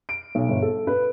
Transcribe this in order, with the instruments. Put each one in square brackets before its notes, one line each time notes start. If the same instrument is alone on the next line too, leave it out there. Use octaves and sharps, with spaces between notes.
[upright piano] D7
B1
G1
A4
B4